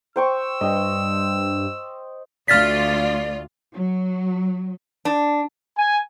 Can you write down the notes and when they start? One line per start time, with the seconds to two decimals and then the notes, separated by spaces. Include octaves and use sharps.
0.16 C5 G5 C#6 E6
0.61 G2 D#5 G5
2.48 D2 F4 D5 F6 A6 B6
3.73 F#3
5.05 D4
5.76 G#5